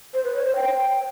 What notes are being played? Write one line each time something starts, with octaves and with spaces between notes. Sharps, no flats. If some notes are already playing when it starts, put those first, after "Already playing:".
C5
B4
C#5
C5
G5